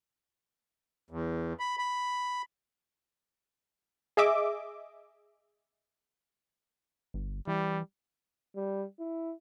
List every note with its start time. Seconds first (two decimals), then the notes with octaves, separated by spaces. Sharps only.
1.10 E2
1.59 B5
1.79 B5
4.17 G#4 D#5 E5 D6
7.14 G1
7.47 E3 G3
8.56 G3
8.99 E4